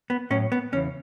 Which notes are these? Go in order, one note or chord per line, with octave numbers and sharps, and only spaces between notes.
B3
A2 F#3 C#4
B3
E2 C#3 E3 C#4